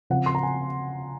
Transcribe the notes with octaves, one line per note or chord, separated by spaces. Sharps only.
C#3 F3 C4 F#5
C6
A#5
G#5